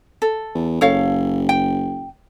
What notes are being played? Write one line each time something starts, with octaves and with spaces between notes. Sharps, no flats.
A4
E2
F#1 A4 C#5 F5
G5